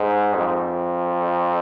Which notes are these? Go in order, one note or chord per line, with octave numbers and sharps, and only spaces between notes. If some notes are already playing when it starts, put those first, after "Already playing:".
Already playing: G#2
F2